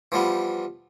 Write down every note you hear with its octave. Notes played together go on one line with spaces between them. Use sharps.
E3 F3 G3 B3